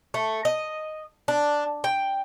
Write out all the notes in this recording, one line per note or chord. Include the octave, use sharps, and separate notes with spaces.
A3
D#5
D4
G5